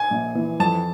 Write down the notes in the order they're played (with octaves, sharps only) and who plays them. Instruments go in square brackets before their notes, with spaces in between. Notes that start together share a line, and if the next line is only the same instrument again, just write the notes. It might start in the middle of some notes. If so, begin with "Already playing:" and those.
Already playing: [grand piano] G#5
[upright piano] A#1
E3
[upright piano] F2 [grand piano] A5